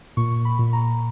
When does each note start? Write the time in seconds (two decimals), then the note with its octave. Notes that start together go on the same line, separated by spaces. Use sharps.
0.17 A#2 C#6
0.45 B5
0.59 A#2
0.73 A#5